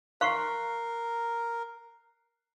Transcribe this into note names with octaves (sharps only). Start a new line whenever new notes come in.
A#4 F5 C6 C#6 F#6 C7